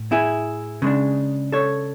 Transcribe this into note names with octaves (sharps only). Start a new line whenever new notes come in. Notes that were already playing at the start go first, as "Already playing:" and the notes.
Already playing: A2
E4 G#4
C#3 G#3 D4
A4 C#5